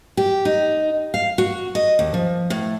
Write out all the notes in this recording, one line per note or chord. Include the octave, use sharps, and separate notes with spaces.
G4
D#4
F5
F#4
D#5
D#2
F3
A2